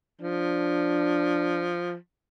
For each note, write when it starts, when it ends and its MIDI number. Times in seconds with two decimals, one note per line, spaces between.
0.21 1.95 53
0.21 1.76 62